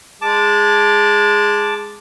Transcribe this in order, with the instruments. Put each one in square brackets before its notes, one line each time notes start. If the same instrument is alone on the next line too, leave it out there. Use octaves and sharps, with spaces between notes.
[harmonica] G#3 [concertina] A5 D6